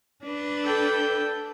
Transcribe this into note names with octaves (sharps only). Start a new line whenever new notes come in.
D4 B4
A4 G5